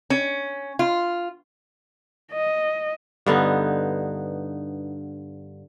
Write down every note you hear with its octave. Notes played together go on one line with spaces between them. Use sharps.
C#4
F4
D#5
G2 D3 B3 D#4